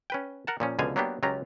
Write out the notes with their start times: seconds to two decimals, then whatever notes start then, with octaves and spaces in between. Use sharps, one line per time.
0.10 C#4 B4 G5
0.47 A#4 F#5 A5
0.60 A#2 F3 C#4
0.79 C#2 B2 D3 F3 F5 G#5
0.96 F#3 A#3 B3 D4 G4
1.23 C#2 F#3 C#4 F4 G4 A#5